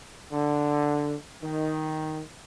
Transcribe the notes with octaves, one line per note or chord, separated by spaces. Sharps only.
D3
D#3